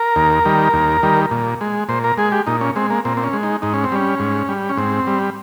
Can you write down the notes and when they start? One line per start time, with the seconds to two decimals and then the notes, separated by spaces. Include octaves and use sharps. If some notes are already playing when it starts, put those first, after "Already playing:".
Already playing: A#4
0.16 D#2
0.45 D#3 G3
0.74 D#2
1.03 D#3 G3
1.31 A#2
1.61 G#3
1.89 A#2 C5
2.04 A#4
2.18 G#3 G#4
2.32 G4
2.46 A#2 D#4
2.61 C#4
2.76 G#3 C4
2.90 A#3
3.05 A#2 C4
3.17 C4
3.24 C#4
3.33 G#3
3.43 D#4
3.62 G#2 D#4
3.74 C#4
3.84 C4
3.92 G3 C#4
4.20 G#2
4.49 G3
4.69 C#4
4.77 G#2 C4
5.07 G3